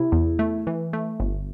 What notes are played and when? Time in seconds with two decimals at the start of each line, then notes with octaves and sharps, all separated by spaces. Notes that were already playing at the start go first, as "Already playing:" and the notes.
Already playing: C3 E4
0.12 E2
0.39 A3
0.67 E3
0.93 A3
1.20 G1